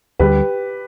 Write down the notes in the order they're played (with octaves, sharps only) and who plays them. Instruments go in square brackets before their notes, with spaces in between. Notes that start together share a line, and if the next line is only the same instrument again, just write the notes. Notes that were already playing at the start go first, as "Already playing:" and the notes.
[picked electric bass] D2 D3 G3 [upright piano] G4 B4